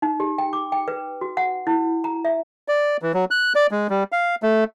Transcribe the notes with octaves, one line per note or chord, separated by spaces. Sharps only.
D#4
G4
G5
D6
G5
B4
F#4
F#5
E4
A#5
E5
D5
E3
F#3
F#6
D5
G#3
G3
F5
A3